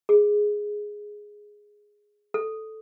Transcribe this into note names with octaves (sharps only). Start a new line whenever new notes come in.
G#4
A4